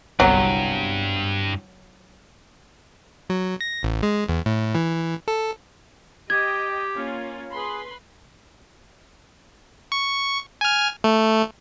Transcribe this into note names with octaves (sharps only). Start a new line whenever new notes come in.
G1 C2 G2 F#3
F#3
A#6
A1
G#3
E2
A2
E3
A4
G4 D#5 G5 G#6
A#3 C#4 F4
G#4 B4 B5 C6
C#6
G#5 F6
A3